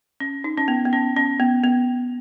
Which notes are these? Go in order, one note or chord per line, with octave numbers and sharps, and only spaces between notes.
C#4
D#4
C#4
B3
B3
C#4
C#4
B3
B3